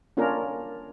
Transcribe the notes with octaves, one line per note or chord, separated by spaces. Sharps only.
A#3 C#4 D4 F4 A#4